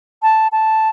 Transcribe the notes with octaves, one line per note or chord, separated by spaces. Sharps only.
A5
A5